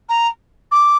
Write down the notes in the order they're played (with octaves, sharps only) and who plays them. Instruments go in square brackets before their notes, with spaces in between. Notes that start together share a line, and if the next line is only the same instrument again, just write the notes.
[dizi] A#5
D6